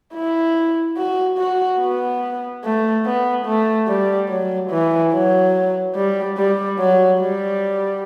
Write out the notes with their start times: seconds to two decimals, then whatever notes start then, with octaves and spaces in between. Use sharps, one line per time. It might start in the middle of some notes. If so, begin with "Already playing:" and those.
0.15 E4
0.97 F#4
1.39 F#4
1.80 B3
2.64 A3
3.05 B3
3.46 A3
3.88 G3
4.30 F#3
4.71 E3
5.13 F#3
5.96 G3
6.37 G3
6.79 F#3
7.21 G3